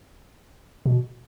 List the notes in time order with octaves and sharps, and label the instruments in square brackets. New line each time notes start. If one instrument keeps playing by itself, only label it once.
[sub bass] B2